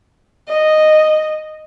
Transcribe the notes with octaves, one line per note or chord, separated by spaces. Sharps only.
D#5